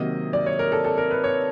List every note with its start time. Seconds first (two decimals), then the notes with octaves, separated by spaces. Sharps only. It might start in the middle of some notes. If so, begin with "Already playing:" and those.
Already playing: C3 D#3 F#3 A#3 D#5
0.33 D5
0.46 C#5
0.59 A#4
0.72 A4
0.85 A4
0.98 A#4
1.11 B4
1.24 C#5